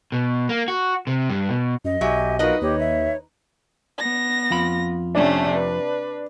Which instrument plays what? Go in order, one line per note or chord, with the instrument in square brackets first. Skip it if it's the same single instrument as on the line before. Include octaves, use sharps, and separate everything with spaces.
[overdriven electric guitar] B2
A#3
F#4
C3
G2
B2
[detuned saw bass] F#2 [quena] D#5
[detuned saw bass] B1 [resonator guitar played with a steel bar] F#3 E5 [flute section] G4 G#5
[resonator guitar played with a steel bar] D#4 B4 D#5 [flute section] F4 F#4 A#4
[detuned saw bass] D#2 [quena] G4 [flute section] C#5
[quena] E5
[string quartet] B3 A#6
[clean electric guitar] F2 F4 B5
[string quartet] C3 A3 C#4 [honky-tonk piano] D4
[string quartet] B4